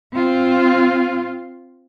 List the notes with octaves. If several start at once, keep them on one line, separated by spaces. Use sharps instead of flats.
C4 F4